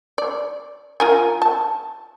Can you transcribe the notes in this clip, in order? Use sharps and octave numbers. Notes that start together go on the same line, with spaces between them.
D5
F4 A#4 G#5
A5